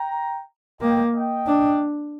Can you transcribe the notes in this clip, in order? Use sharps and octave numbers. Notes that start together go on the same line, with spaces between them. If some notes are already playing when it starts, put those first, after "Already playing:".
Already playing: G5 A#5
A#3 D#5 G5
D#5 G5
D4